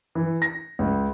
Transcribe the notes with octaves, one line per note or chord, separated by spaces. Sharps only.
E3
A#6
C#2